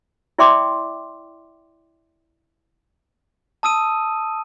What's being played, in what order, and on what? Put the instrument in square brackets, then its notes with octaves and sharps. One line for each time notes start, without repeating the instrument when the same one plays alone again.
[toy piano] E4 D5 E5 G5 C6 D6
[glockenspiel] A5 D#6 E6 D#7